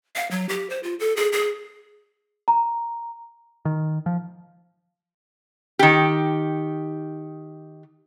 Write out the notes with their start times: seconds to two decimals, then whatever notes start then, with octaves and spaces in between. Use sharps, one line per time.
0.16 F5
0.31 F#3
0.49 G4
0.70 C5
0.83 F4
0.99 A4
1.17 G#4
1.32 G#4
2.48 A#5
3.65 D#3
4.06 F3
5.79 D#3 G4